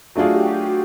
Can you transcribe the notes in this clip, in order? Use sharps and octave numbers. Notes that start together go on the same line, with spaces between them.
F#3 A3 D4 F4 F#4 G#4
G4